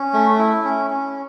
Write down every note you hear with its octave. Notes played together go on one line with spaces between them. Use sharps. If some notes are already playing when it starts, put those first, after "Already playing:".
Already playing: C#4
A3
E4
C#4
C#4